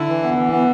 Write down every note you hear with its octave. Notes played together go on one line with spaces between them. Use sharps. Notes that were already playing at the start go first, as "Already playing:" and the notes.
Already playing: D3 E4
E3
B3
E3
B3